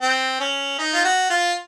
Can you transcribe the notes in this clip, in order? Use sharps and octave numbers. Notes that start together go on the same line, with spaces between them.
C4
C#4
D#4
F4
F#4
F4